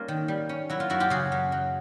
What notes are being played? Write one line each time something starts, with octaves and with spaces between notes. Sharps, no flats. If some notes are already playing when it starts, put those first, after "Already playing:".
Already playing: G3 A#3 C#4 F4
D#3
G3
C#4
F#3 E4
F4
F#2 E4 F#4
F4 G4
C#3 F#4 G#4
F#2
F#3